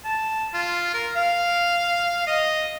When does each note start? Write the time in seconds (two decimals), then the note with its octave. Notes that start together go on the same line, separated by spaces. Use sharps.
0.04 A5
0.54 F4
0.94 A#4
1.16 F5
2.27 D#5